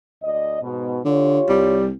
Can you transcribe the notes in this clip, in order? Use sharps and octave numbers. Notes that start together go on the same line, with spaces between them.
D2 D5 D#5
G#2 B2
D3 F4 G4 C#5
C2 G3